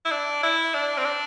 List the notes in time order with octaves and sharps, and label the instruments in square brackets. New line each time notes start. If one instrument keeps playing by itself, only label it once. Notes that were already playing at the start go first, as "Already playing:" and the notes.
[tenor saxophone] E4
D4
E4
D4
C4
D4